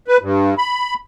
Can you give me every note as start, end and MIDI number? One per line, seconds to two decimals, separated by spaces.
0.08 0.17 71
0.21 0.55 43
0.58 0.94 83